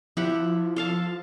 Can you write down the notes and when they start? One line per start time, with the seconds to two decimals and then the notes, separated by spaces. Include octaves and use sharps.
0.17 F3 E4 G4 F#5
0.76 A4 F5 A5